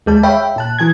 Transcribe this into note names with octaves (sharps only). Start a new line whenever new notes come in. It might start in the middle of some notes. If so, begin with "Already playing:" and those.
D#2 G#3 A5
C#5 E5 F5 G5 B5
A#2 A5 F#6
E3 G#5 G#6